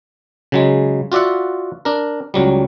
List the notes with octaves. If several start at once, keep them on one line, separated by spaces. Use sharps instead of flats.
C#3 F#3 G#3
F4 F#4 D5 E5 F#5
D4 A#4
C#2 F#3 G3